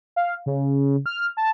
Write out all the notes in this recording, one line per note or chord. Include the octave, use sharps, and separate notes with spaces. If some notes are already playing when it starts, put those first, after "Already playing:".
F5
C#3
F6
A5